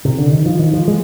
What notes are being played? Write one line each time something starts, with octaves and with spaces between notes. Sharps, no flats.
C3
D3
D#3
F3
D#3
F3
G#3